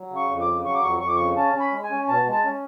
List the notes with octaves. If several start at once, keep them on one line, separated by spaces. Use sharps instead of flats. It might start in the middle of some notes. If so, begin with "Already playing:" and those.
Already playing: F#3
C#3
C#6
F2
D6
C#3
F#3 C#6
D6
F2 C#6
F2 C#6
D6
C#3 C#6
C#4 A5
C#4
B5
G#3
G#5
C#4
B2 A5
G#3
A5
C#4